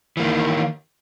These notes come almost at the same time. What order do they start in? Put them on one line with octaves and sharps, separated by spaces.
E3 A#3 D#3